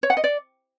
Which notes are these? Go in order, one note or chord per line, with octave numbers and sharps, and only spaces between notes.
C#5
F#5
D#5
D5